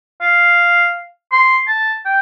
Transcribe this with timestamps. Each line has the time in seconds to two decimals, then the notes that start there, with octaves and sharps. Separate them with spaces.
0.21 F5
1.32 C6
1.68 A5
2.06 G5